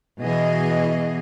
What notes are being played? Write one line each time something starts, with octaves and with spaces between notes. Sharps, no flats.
B2 E3 G#4 D#5